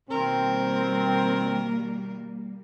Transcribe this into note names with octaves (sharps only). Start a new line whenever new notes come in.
B2 D#3 G3 A#3 C4 A#4